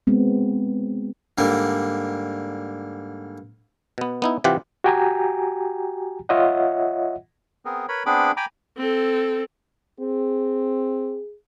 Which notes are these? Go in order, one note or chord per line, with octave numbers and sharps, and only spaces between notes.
G#3 B3 C4
G#2 D3 G3 A#3
B2 B3
B3 D#4 E4
C3 E3 F4 G4 F#5
F#4 G4 G5 G#5 A#5
F4 C#5 D#5 E5 F#5
B3 C4 G#4 A#4
A#4 B4 C#5 B5
B3 C4 D4 G#4 B5 D6
G5 G#5 A#5 B5 D6
C4 A4
C4 G#4